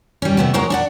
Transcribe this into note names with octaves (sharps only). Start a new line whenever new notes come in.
G3 C#4
C3 A3 B3
F#3 G#3 A#4 C5 C#5
D4 D5 F#5